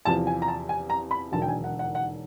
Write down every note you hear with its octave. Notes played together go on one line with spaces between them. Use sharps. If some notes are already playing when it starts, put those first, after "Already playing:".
E2 C3 F3 A5
G#5
A#5
A5
G#5
A#5
B5
E1 D#2 D3 F#3 A5
G5
G#5
F#5
F#5
F#5